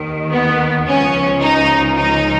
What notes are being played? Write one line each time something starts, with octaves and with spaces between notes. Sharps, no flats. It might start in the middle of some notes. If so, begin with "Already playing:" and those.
Already playing: D#2 D#3
B3
C#2 C#3 F3 C#4
D#4
D#4